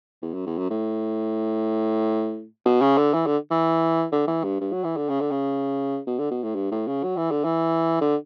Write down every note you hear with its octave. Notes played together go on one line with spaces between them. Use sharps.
E2
F#2
E2
F#2
A2
B2
C#3
D3
E3
D3
E3
D3
E3
G2
G2
F#3
E3
D3
C#3
D3
C#3
B2
D3
B2
A2
G2
A2
C#3
F#3
E3
D3
E3
D3